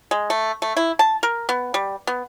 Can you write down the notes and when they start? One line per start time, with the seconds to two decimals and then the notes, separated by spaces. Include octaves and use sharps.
0.11 G#3
0.30 A3
0.62 A3
0.77 E4
0.99 A5
1.23 A#4
1.49 B3
1.74 G3
2.07 B3